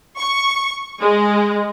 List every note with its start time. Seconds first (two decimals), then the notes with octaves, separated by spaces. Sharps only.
0.17 C#6
1.01 G#3